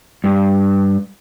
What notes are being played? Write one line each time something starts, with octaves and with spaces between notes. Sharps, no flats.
G2